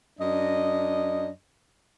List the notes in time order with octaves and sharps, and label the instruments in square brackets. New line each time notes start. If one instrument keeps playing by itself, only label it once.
[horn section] F#2 D4 D#5